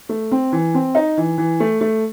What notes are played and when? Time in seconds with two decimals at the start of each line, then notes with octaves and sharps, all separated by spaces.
0.09 A3
0.31 C4
0.52 E3
0.74 C4
0.95 D#4
1.17 E3
1.38 E3
1.60 A3
1.81 A3